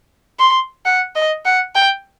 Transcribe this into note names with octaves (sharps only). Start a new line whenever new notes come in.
C6
F#5
D#5
F#5
G5